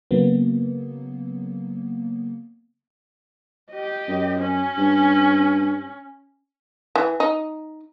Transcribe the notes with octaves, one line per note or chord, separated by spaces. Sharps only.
C#3 F#3 A#3 B3
G4 D#5
F#2
C#4
G2
E3
D#4